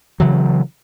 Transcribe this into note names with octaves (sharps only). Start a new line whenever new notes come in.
C#3 E3 F#3